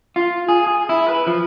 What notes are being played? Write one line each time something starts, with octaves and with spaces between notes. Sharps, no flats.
F4
G#4
G#4
E4
B4
F3